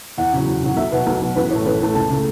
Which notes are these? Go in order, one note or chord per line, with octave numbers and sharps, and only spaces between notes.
E2 F#5
C#3 F#3
E2
C#3 F#3
B1 E5
B2 F#3 B3
B1
B2 F#3 B3
A1 B4
A2 A3 C#5
A1 B4
A2 A3
C#2 A5
C#3 A3